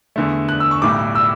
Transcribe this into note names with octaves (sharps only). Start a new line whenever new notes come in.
E2 D3 A3
F#6
E6
C#6
B1 A2 G3 D6
E6